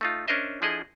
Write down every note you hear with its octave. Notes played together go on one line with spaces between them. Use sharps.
A3 D#4 F4
C#4 D4 A#4 C5 D#5 E5
F3 D4 E4 G#4 A4 D#5